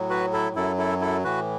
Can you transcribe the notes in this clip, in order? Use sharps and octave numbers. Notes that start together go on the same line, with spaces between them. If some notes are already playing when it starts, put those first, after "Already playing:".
Already playing: A2 F#3
F#4 B4
E4 A4
F#2 F#3 E4 A4
E4 A4
E4 A4
A2 E3 F#4 B4